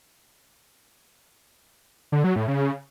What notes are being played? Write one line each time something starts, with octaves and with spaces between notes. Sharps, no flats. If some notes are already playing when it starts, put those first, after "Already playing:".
D3
F#3
A2
C#3